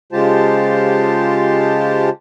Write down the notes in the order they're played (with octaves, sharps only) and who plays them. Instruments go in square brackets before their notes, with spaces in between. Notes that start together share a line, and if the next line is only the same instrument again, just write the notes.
[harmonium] C#3 G#3 F4 G4 C5 A5